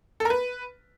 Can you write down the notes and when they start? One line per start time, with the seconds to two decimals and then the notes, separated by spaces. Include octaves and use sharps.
0.20 A4
0.25 A#4
0.30 B4